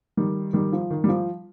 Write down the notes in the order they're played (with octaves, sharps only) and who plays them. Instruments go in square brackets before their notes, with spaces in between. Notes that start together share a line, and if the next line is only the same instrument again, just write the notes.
[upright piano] D#3 G3
D#3 G3
F3
D#3
G3
F3